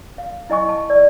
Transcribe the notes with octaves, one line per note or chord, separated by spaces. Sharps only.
F5
E4 D#5 G#5 C#6
A5
D5